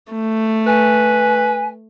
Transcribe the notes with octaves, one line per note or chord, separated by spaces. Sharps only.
A3
B4 G#5